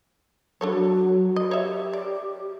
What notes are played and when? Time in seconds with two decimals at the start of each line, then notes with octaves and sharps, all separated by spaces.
0.61 F#3 D4 A4 C#5
1.36 D#5
1.51 G4 C#5 E5
1.93 D5